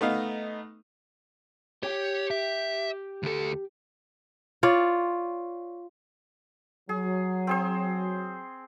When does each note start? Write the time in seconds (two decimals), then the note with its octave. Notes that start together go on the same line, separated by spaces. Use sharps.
0.01 A3 B3 D#4 F5
1.83 G4 C#5 G5
2.31 E5
3.23 D2 A4
4.63 F4 C#5 D5
6.89 F#3 G#4
7.47 C4 G#4 C5